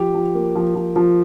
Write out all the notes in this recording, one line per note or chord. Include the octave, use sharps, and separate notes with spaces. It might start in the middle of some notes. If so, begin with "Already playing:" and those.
Already playing: F3 G4
F3
A#3
F3
F3
F3